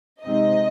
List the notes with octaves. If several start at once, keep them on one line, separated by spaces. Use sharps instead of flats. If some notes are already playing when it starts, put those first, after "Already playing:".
C3 G#3 C4 D#4 D#5